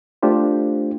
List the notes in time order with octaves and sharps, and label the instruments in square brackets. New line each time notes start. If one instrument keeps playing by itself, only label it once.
[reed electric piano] A3 D4 F4 G4 C5